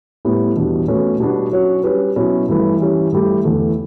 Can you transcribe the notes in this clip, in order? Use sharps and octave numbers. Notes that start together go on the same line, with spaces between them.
A2 G3 B3
E2 B2 G3 D4
B2 A3 C#4 F#4 B4
B2 G3 B3 D4 F#4
F#3 C#4 F#4 C#5
G3 C#4 G4 B4
B2 F#3 C#4 E4
G2 E3 A3 E4 B4
E3 G3 C#4
G2 E3 A3 E4 G4
E2 D3 A3